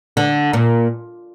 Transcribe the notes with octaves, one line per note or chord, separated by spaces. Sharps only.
D3
A#2